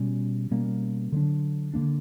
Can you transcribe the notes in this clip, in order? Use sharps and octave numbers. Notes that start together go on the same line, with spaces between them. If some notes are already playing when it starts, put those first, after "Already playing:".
Already playing: B2 G3 C#4
B2 G3 A#3 C#4
D3 F#3 A#3 D4
D3 F#3 A#3 D4